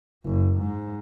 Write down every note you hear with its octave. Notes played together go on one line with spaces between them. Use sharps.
F#1
G#2